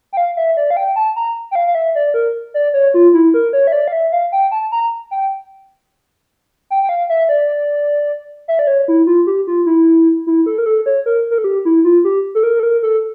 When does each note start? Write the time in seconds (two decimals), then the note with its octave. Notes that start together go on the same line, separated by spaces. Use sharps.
0.13 G5
0.17 F5
0.37 E5
0.57 D5
0.70 F5
0.77 G5
0.96 A5
1.16 A#5
1.51 G5
1.55 F5
1.67 F5
1.75 E5
1.95 D5
2.14 A#4
2.54 D5
2.74 C#5
2.94 F4
3.14 E4
3.34 A#4
3.53 C#5
3.67 E5
3.72 D5
3.88 F5
3.92 E5
4.12 F5
4.32 G5
4.52 A5
4.72 A#5
5.11 G5
6.70 G5
6.83 G5
6.89 F5
7.10 E5
7.29 D5
8.48 E5
8.59 D5
8.67 C#5
8.88 E4
9.07 F4
9.27 G4
9.47 F4
9.66 E4
10.27 E4
10.46 A4
10.58 A#4
10.66 A4
10.86 C#5
11.06 A#4
11.31 A#4
11.38 A4
11.44 G4
11.65 E4
11.85 F4
12.04 G4
12.35 A4
12.43 A#4
12.59 A4
12.63 A#4
12.83 A4